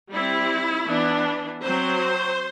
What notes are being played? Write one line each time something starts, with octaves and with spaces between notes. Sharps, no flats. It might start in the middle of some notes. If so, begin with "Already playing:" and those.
G3 C4 E4
E3 B3 D4
F#3 C4 C5